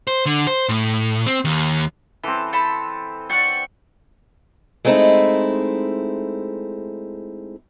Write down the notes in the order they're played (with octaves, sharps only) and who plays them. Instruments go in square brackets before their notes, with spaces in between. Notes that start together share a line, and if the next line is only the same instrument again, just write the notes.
[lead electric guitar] C5
D3
C5
A2
C4
D#2
[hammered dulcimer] E3 C4 [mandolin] A4
[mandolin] A4 A5 B5
[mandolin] D5 F#5 [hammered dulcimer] G5 [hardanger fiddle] C#6
[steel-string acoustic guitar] G#3 A3 C4 D#4 E4